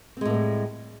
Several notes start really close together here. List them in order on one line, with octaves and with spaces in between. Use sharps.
C4 G#3 A2 A#3 G3